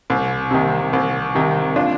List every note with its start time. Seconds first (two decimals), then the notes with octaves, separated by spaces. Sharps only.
0.10 C2
0.51 C3 D#3
0.93 C2
1.35 C3 D#3
1.76 D4 F4